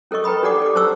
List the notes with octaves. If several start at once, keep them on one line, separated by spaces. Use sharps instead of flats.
C#4 A4 A#4 D#5 C#6
B4 G5 A#5 B5 D#6
D4 G4 A4 D5 F#5 D6
A4 D6
C#4 C5 A5 C#6 E6